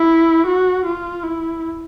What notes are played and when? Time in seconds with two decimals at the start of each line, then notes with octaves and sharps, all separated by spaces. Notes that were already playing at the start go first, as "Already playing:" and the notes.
Already playing: E4
0.47 F#4
0.85 F4
1.23 E4